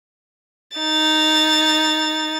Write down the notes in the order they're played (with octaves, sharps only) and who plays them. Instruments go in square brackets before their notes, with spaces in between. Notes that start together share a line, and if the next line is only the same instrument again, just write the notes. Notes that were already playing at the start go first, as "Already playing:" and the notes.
[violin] D#4 A6